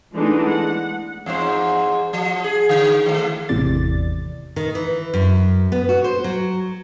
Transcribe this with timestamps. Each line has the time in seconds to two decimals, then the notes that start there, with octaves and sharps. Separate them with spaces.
0.16 E3 G#3 A3 B3 D4 D#4
0.49 F#5
1.26 E2 G#2 C5
2.13 F3
2.44 G#4
2.69 D3
3.06 D#3 G#3 A3
3.49 G#1 E2 A2 C3 D5 A6
4.56 D#3
4.75 E3
5.14 F#2
5.72 B3
5.89 F#4
6.04 C5
6.24 F#3